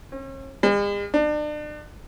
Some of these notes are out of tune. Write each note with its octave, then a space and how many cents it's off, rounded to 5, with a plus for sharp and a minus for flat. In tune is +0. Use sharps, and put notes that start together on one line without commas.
C#4 -45
G#3 -45
D4 +35